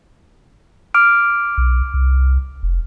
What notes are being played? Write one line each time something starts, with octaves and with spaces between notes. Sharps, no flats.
D6 F6 D7
B1
C2
F1